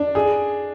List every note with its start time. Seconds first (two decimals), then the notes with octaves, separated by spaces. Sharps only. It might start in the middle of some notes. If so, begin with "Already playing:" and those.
Already playing: D4
0.15 G#4